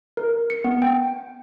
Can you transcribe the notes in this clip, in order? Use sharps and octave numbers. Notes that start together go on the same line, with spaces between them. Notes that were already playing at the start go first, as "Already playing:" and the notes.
A#4
C#7
B3
G5